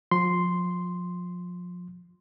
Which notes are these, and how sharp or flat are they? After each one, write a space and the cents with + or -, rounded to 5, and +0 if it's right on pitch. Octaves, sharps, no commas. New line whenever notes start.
F3 +30 C6 +0